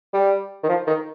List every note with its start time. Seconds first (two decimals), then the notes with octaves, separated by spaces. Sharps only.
0.14 G3
0.63 D#3
0.69 F3
0.87 D#3